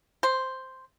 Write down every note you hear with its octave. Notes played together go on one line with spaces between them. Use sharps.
C5